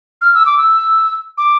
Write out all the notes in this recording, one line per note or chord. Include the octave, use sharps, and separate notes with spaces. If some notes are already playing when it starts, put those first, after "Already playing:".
F6
E6
D6
E6
D6